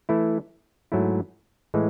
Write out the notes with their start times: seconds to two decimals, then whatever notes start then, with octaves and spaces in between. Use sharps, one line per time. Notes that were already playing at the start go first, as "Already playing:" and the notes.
0.09 E3 A3 E4
0.92 G#2 F#3 A3 E4
1.74 A2 E3 G#3